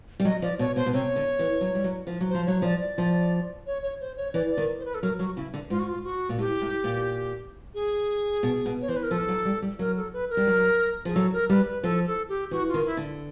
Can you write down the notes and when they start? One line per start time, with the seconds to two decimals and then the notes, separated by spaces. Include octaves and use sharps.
0.20 G3
0.25 F#3 D#5
0.42 F3 D5
0.59 B2 C#5
0.76 B2 C5
0.86 B2
0.94 C3 C#5
1.16 D3
1.39 E3
1.61 F#3
1.75 G3
1.84 F#3
2.07 F3
2.21 F#3
2.30 F3 C5
2.46 F#3 C#5
2.62 F3 D5
2.81 D5
2.98 F3
3.66 C#5
3.82 C#5
4.01 C5
4.17 C#5
4.34 E3 D5
4.51 D5
4.57 D#3
4.80 C5
4.85 B4
4.94 A4
5.02 F#3 A#4
5.19 F#3 F#4
5.36 C#3 E4
5.54 D3
5.70 G#2 F4
5.79 F#4
5.87 F4
6.04 F#4
6.29 A#2
6.39 A2 G4
6.62 A2
6.84 A#2
7.75 G#4
8.43 B2
8.66 B2
8.82 C#5
8.88 E3 C5
8.96 B4
9.03 A#4
9.11 F3 A4
9.28 F#3
9.45 G3
9.62 G3
9.79 F#3 A#4
9.97 A4
10.13 B4
10.30 A#4
10.37 G3
10.47 F#3
11.05 F3 G#4
11.15 F#3 A4
11.33 A#4
11.49 G3 B4
11.67 B4
11.84 F3 A4
12.07 A4
12.29 G4
12.51 E3 F#4
12.68 F4
12.74 D#3
12.85 E4
12.97 D3